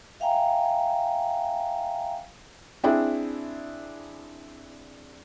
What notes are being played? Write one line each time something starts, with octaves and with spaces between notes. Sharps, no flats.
E5 F5 G5 G#5 A#5
C4 D4 E4 G#4